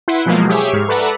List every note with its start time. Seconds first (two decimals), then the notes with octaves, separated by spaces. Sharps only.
0.08 E4 B4 F#5 C6
0.26 B2 F3 F#3 G#3 A#3
0.49 G4 G#4 C#5 E5
0.73 G#2 C#6 F6 C7
0.88 A4 B4 D5 E5 F#5 A#5